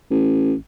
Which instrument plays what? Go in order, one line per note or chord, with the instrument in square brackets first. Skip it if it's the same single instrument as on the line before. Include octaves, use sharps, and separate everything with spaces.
[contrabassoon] A1